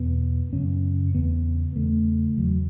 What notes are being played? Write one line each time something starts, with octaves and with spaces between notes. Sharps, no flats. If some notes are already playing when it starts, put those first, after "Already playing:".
Already playing: E2 B2 B3
F#2 C#3 C#4
E2 C#3 B3
E2 C#3 A3
E2 C#3 F#3